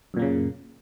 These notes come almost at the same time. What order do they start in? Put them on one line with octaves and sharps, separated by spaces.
F#2 A#2 A#3 C#3